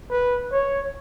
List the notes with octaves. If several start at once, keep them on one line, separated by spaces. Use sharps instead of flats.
B4
C#5